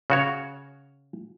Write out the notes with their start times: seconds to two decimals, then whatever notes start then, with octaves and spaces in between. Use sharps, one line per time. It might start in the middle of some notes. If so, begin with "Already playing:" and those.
0.10 C#3 F#4 C#5